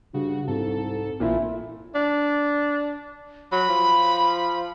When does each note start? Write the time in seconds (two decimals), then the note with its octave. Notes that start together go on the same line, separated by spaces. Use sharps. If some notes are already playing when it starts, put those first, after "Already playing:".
0.14 G2 C#3 F#4
0.48 C2 G#2 A4
1.20 A1 A#2 F3 E4
1.95 D4
3.52 F#3 B5
3.69 F3